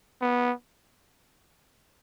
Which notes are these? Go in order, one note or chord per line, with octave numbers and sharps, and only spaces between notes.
B3